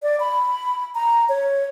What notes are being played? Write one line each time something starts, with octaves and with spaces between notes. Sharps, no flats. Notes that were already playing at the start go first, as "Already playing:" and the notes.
D5
B5
A#5
C#5